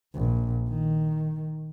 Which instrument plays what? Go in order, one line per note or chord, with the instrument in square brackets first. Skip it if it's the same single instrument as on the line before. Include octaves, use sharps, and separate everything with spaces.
[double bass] A#1
D#3